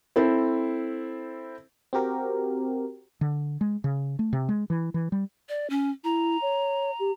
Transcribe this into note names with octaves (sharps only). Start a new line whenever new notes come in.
C4 E4 A4 C5
C4 F#4 G4 A#4
D3
G#3
C#3
A3
C3
G#3
E3
E3
G3
D5
C#4
E4 A#5
C#5
G4